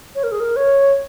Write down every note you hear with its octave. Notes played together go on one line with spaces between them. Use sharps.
C#5
A#4
G#4
A#4
C#5